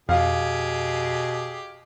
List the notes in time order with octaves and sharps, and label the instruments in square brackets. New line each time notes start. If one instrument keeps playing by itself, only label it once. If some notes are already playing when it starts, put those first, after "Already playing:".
[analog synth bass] F2 [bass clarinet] B2 [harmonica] G4 G#4 [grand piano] F5